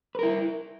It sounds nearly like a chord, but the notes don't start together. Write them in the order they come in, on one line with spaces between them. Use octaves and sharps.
B4 A#4 E4